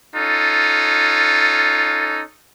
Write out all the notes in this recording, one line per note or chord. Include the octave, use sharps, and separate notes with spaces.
C#4 D#4 F4 A4